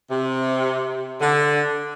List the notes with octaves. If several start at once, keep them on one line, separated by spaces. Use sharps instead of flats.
C3
D3